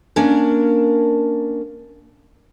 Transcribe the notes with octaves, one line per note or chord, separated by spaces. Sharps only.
A#3 C#4 D4 A#4